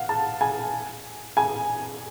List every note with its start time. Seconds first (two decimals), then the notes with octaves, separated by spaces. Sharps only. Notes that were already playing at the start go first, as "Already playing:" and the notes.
Already playing: F5 F#5
0.09 A5
0.41 G#5
1.37 G#5